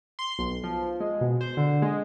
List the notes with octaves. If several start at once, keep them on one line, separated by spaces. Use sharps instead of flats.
C6
B1
F3
G#3
B2
C5
D3
G#3